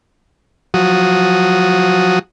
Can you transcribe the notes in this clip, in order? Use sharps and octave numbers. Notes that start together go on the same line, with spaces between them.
F3 F#3 F#4 D#6